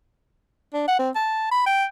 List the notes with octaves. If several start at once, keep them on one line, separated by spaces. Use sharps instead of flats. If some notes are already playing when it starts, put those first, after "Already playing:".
D4
F#5
C4
A5
B5
G5